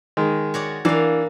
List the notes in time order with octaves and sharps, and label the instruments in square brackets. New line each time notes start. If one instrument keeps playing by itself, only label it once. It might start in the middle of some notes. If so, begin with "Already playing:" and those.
[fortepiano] D#3 G#3
[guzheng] F#4 C#5 D5
[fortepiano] E3 D4 [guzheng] A#3 F5